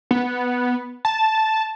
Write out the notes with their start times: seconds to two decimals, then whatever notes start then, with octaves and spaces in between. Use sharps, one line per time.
0.11 B3
1.05 A5